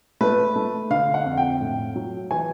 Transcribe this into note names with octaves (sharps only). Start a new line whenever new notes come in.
A3 B4
A3
D3 F5
F#5
F2
G5
A2
F#3
E3 G#5